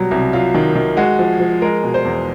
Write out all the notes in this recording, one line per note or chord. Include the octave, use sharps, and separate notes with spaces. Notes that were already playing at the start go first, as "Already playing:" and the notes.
Already playing: B2 F#3 G3
C2
F#3 F4
D#3
D#3
G#3 F#4
F3
F3
G#3 A#4
B2
C5
E2